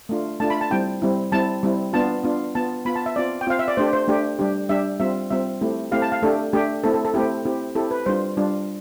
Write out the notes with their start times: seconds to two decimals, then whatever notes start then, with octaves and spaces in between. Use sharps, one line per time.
0.09 A3 D4 F4
0.40 A3 D4 F4 A5
0.50 B5
0.61 A5
0.71 G3 C4 E4 G5
1.02 G3 C4 E4
1.32 G3 C4 E4 A5
1.63 G3 C4 E4
1.93 B3 D4 F4 A5
2.24 B3 D4 F4
2.55 B3 F4 A5
2.85 B3 F4 B5
2.96 A5
3.06 E5
3.16 C4 F4 D5
3.41 G5
3.47 C4 F4 F5
3.59 E5
3.68 D5
3.77 A3 D4 G4 C5
3.93 C5
4.08 A3 D4 G4
4.39 G3 D4 G4
4.69 G3 D4 G4 E5
5.00 G3 C4 F4 E5
5.30 G3 C4 F4 E5
5.61 A3 C4 E4 G4
5.91 A3 C4 E4 G4 F5
6.02 A5
6.12 F5
6.22 A3 D4 G4 A4
6.53 A3 D4 G4
6.84 A3 C4 E4 A4
6.94 A4
7.05 A4
7.14 A3 C4 E4 G4
7.45 C4 E4 G4
7.75 C4 E4 G4 A4
7.91 B4
8.06 G3 D4 F4 C5
8.37 G3 D4 F4